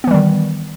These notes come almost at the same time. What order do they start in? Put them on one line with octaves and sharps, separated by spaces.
B3 E3 G3 D#3